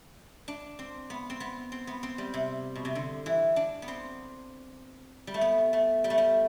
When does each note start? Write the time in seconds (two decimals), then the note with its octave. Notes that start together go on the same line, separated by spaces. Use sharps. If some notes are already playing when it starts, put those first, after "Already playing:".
0.48 D4
0.79 C4
1.10 B3
1.30 C4
1.40 B3
1.72 C4
1.87 B3
2.03 C4
2.18 G3
2.34 C3
2.75 B2
2.85 C3
2.95 D3
3.26 E3
3.56 D4
3.82 B3
3.88 C4
5.27 G3
5.34 A3
5.41 B3
5.73 A3
6.04 G3
6.10 A3
6.18 G3